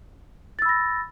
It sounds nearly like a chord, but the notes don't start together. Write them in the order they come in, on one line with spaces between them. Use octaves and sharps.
A6 E6 B5 A#6